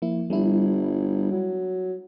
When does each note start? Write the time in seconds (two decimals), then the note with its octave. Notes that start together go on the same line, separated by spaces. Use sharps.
0.02 F3 A#3 E4
0.30 G1 G3 E4
1.31 F#3